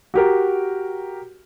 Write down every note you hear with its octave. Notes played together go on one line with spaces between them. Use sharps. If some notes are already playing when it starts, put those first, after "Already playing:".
F#4 G4 A#4